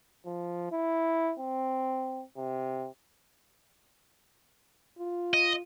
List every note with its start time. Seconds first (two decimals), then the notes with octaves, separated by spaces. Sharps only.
0.26 F3
0.72 E4
1.39 C4
2.37 C3
4.98 F4
5.34 D#5